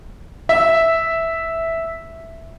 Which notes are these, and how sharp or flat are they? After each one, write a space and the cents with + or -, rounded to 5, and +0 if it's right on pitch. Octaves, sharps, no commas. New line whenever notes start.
E5 -5